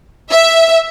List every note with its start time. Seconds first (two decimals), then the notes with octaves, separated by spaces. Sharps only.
0.32 E5